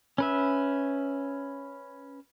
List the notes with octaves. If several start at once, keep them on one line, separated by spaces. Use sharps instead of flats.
C#4 B4 E5